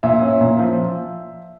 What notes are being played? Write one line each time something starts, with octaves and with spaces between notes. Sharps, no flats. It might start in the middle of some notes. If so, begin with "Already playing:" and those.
A#2 E5
C#4
A#2
F3